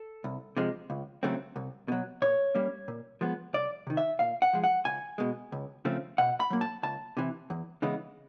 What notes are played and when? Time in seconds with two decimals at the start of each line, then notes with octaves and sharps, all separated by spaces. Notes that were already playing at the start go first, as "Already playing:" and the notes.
Already playing: A4
0.24 C2
0.56 C3 F3 G#3
0.90 C#2
1.23 C#3 F#3 A3 C4
1.56 C2
1.88 B2 F#3
2.22 A#2 C#5
2.55 G3 A#3 C#4
2.88 A#2
3.21 F3 G#3 B3
3.54 C2 D5
3.87 C3 D#3
3.97 E5
4.19 A#2 F5
4.42 F#5
4.53 F3 G#3
4.64 F#5
4.85 C#2 G#5
5.18 B2 G#3
5.52 C#2
5.85 C#3 F3 A3 C4
6.18 B2 F#5
6.40 B5
6.50 F#3 A#3
6.61 A5
6.83 C#2 A5
7.17 C3 E3
7.50 E2
7.82 C#3 E3 G#3 B3